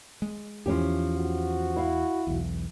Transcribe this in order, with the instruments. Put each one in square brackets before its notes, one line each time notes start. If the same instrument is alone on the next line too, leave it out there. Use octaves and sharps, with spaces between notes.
[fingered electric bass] G#3
[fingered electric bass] E2 E3 [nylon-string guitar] F3 C#4 G4
[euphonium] F#4
[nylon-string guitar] E4 F5
[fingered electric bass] B1 E2